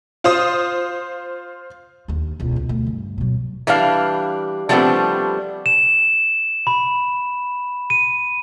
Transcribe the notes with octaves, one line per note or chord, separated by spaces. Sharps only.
F4 C5 D#6
D#2 D4
E1 C#2
B2
D2
G2
B2 F#3
E3 G3 D4 F5
F3 G3 A3 B3 C4 D4
E7
B5
D#7